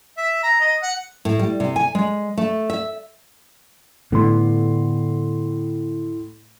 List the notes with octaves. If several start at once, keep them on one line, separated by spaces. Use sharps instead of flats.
E5
A#5
D#5
F#5
A2
G3
C3
G#5
G#3
A3
E5
A2 D3 B3 C6